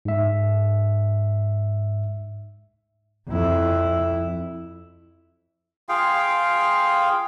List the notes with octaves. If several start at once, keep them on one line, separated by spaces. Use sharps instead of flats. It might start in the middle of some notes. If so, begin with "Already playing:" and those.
G#2 E5
F2 E4
F4 G#4 F5 G5